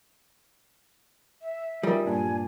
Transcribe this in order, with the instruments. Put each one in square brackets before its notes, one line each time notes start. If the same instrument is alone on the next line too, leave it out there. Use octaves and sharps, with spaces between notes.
[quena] E5
[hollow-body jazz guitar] G3 [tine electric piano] D#4 G#4 [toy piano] F4 A#4
[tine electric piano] G2 A#2 D4 [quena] G#5